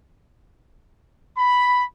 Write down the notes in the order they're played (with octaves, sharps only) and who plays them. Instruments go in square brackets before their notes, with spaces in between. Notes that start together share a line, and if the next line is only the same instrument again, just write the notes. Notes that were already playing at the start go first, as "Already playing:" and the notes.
[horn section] B5